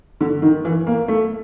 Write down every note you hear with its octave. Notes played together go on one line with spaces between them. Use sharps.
D3
D#3
E3
A#3
A3